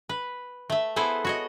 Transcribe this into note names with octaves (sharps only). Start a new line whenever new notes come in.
B4
A3 E5
B3 E4 G#4 A4 B4 C5
F#4 C#5 D#5